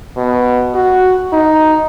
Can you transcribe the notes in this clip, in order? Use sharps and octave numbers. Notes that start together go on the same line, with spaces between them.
B2
F#4
D#4